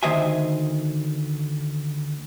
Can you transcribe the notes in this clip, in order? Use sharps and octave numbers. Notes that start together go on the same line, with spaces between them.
D2 D#3 C5 D#5 E5 G#5